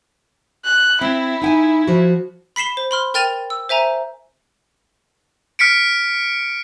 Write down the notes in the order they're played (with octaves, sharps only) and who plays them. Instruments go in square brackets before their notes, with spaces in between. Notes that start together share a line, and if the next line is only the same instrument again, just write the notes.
[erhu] F#6
[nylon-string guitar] C4 [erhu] E4
[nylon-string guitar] D#4 G5 G#5
F3 F#4
[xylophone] B5 B6 C7 E7 G7
C5
B5 C6 F6
A#4 G5 F6 A6 D#7 F7
E6
C5 E5 G#5 A#5
[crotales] F6 B6 C#7 D7